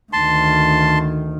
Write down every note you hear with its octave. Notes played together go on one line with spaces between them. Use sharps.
D2 D#3 A5 C6